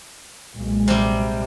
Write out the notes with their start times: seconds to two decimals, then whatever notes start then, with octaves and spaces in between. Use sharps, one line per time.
0.56 B1 A#2 G#3
0.88 C3 G3